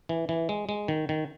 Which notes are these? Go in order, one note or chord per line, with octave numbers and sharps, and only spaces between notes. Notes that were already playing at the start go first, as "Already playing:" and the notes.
E3
E3
G#3
G#3
D#3
D#3